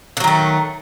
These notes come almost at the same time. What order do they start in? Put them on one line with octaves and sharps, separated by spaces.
D3 F#3 D#3 A3